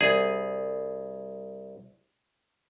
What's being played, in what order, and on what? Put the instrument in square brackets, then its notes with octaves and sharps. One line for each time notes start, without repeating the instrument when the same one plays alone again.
[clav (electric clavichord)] C2 G#4